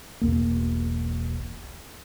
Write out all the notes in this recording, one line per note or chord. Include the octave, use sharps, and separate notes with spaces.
E1 B1 E2 A#3